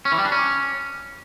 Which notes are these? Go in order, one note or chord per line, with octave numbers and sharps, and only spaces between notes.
C#4
E3
G3
D4
C#4